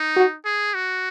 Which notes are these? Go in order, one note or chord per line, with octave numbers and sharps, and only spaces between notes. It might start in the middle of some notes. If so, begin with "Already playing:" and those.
Already playing: D#4
F#4
G#4
F#4